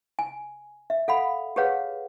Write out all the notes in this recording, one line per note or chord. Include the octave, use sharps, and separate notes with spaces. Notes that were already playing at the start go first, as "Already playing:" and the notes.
G#5
E5
A4 F5 F#5 B5
G4 G#4 B4 C#5 F5 F#5